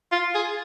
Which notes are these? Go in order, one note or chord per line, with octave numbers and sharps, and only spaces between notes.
F4
G#4